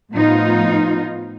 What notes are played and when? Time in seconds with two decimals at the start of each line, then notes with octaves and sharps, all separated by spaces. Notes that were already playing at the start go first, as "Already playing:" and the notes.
0.13 A2 F3 B3 D#4 F4